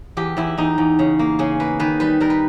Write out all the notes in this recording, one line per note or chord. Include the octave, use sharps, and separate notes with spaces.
E2 G4
E2 E4
E2 D#4
E2
C#3
A#3
C#3 G#4
A#3 B4
D#3 B4
G3 B4
G3 A#4
B4